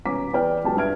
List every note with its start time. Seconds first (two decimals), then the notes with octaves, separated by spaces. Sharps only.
0.05 D#1 B2 C#4 A#5 D6 B6
0.33 E2 E3 D5 G5 F6
0.63 C#2 B2 F#3 G#4 G5 A5
0.77 G2 E5 F6 G#6 D7